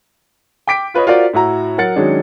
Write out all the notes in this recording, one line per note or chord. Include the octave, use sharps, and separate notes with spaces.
G5 D6 B6 D7
F4 B4 C#5 D#5
F4 F#4 A#4 C5 D5
A2 E4 F#4 A#5
F#3 A#4 F#5 A6 C#7
D#3 F#3 G#3 C#4 D4